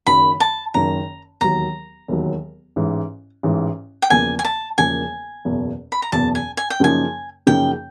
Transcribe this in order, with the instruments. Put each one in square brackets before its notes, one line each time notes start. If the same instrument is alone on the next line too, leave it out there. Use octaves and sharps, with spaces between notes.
[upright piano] F#1 F#2 D#3 [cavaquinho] B5
[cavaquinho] A5
[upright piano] F#1 F#2 D#3 [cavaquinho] A#5
[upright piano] E1 D#2 D#3 F#3 [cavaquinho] A#5
[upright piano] E1 D#2 D#3 F#3
A1 G#2 E3
A1 G#2 E3
[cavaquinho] G5
[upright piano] E1 E2 C#3 F3 A#3 [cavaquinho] G#5
[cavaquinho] G#5
A5
[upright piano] E1 E2 C#3 F3 A#3 [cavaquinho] G#5
[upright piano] F#1 E2 B2
[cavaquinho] B5
A#5
[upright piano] F#1 E2 B2 [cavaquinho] A5
[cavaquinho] G#5
G#5
G5
[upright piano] F#2 C#3 F3 A#3 D#4 [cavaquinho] G#5
[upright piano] F#2 C#3 F3 A#3 D#4 [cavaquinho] G5